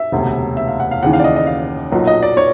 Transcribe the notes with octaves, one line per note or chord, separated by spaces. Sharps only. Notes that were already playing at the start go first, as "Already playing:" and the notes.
Already playing: E5
E1 D2 C3
E5
F5
F#5
F5
D#2 C#3 E3 F#5
F5
D5
D#5
D#5
F5
B1 A#2 F#3
D#5
D5
C#5